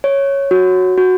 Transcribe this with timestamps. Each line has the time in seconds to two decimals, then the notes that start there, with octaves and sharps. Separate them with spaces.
0.04 C#5
0.51 F#4
0.98 F#4